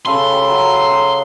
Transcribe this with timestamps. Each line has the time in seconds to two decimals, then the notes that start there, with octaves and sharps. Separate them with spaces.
0.06 C#3 A4 B4 C6
0.32 G4
0.50 F#3
0.92 G#4